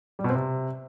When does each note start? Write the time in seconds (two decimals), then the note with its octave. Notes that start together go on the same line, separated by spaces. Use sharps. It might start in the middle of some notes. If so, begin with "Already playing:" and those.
0.19 G3
0.24 B2
0.30 C4
0.35 C3